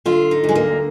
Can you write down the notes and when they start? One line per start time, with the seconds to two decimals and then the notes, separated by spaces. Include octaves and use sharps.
0.06 D3 F4
0.31 D#4
0.44 D2
0.49 G#3
0.55 A#3